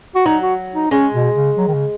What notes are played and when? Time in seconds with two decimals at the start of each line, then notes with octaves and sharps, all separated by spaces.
0.15 F#4
0.26 F#3 D#4
0.42 F#4
0.75 D#4
0.91 G#3 C#4
1.14 B2
1.35 C#3
1.57 F#3
1.68 D#3
1.74 C#3